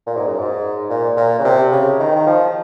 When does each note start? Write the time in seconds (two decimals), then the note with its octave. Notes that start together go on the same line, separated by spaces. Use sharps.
0.07 A#2
0.17 G#2
0.28 F#2
0.38 G#2
0.90 A#2
1.17 A#2
1.39 C#3
1.44 C3
1.72 C#3
2.00 D#3
2.16 D#3
2.27 F3